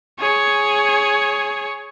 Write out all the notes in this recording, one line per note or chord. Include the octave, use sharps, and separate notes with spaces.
G#4 C#5